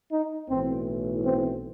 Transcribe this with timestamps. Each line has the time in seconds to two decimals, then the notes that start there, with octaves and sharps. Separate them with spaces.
0.11 D#4
0.49 B1 A2 E3 C4
1.25 C4